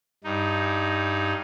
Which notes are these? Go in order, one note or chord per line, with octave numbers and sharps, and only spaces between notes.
G2 D#4